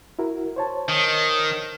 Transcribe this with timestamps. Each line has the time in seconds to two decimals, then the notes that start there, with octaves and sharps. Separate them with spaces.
0.19 E4 F#4 A#4
0.56 C5 C#5 A5
0.89 D#3